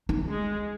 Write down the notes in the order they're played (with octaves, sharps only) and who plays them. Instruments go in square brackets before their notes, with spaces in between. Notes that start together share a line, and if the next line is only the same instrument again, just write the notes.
[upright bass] D#4
[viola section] G#3